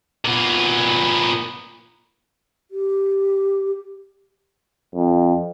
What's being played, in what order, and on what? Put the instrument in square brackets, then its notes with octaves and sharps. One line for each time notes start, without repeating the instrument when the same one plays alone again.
[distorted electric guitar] A#2 B3
[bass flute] G4
[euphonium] F2